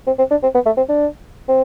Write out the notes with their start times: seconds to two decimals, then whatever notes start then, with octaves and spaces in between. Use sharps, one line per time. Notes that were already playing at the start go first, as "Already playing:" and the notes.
0.07 C4
0.19 C4
0.31 D4
0.43 C4
0.54 B3
0.66 A3
0.77 C4
0.89 D4
1.49 C4